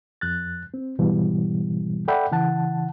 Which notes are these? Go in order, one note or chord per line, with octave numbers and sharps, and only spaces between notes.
F2 F#6 A6
C4
G#2 B2 D3 E3 G3
A4 D5 E5 F#5 G5 B5
C#3 E3 F#5 A5